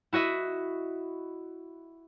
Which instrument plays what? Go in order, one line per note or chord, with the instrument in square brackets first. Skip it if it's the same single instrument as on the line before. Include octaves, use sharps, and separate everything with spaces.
[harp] E4 F#4 D#5 E5